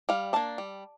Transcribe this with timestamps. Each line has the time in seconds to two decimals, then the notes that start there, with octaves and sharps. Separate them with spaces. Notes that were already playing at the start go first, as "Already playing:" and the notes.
0.09 G3 F5
0.33 A#3 D4 A5
0.58 G3